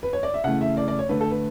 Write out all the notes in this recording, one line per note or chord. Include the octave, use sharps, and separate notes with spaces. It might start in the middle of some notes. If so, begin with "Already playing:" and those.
B4
C#5
D5
E5
C#3 E3 A3 F#5
E5
D5
D5
C#5
D3 A3 B4
A4
B4